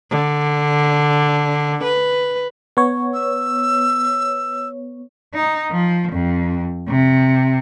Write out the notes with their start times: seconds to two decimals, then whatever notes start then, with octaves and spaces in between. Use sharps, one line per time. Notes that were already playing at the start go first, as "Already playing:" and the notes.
0.11 D3
1.84 B4
2.77 B3 C#5
3.14 E6
5.34 D#4
5.71 F3
6.12 F2
6.88 C3